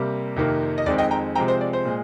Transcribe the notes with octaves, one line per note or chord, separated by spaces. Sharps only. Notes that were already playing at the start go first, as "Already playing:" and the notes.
Already playing: C3 G3 A#3
F2 C3 D#3 A#3
D#5
F2 D#3 G#3 C4 D5
D#5 G5
G5 A#5
C3 F3 G#3 C4 G5 A#5
C5
D5
C5
A#2 G#3